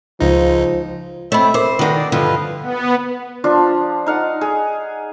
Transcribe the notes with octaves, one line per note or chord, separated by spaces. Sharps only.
C#2 F3 D#4
A3 C4 C#5 D#5 E5 B5
A#4 C5 D6
D#3 D4 D#4 F#4 A4 B4 F#5
D5
G2 D3 F3 B4 D#5 F5
B3
F3 D4 F4
D#4 F5 F#5
G#4